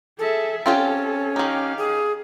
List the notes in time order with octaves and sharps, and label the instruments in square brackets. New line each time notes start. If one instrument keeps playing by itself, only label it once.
[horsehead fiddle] G#4 E5 [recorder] A4
[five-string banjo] C4 F4 G4 [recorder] C#4 [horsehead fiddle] A4
[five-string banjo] D#3 D#4 [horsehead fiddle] G4 F5
[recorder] G#4